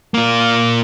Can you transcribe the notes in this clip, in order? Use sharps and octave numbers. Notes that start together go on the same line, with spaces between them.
A#3 F4